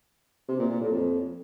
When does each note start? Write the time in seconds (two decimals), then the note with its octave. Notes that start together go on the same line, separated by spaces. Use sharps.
0.49 C3
0.59 A#2
0.70 A#2
0.81 A2
0.92 F2